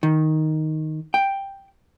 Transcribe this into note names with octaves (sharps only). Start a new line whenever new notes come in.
D#3
G5